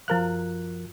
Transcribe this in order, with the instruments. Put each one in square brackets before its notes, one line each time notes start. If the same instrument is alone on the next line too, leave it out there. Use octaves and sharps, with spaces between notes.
[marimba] F#2 F4 F5 [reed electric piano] F3 A#4 F#6